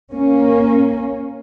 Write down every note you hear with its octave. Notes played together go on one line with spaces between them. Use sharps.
A#3 C#4